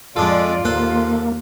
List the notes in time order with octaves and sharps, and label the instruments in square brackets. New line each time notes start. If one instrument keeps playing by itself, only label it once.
[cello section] F2 D5 [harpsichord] G#3 D4 A4 [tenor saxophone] F4
[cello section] D#2 [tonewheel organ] A#3 [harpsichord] A4 C5 F#5